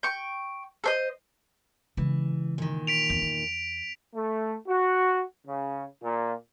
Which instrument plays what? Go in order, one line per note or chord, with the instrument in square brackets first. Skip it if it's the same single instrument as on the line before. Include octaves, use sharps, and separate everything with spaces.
[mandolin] G5 C#6
A4 C5 D#5
[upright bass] C#3 G#3 [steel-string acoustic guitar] E3
[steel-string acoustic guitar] A#2 D#3
[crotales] B6 D7 F7
[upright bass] E2
E2
[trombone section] A3
F#4
C#3
A#2